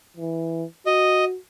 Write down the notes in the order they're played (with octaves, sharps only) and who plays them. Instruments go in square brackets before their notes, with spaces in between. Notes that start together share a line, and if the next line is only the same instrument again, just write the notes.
[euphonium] E3
[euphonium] F#4 [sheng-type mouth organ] D#5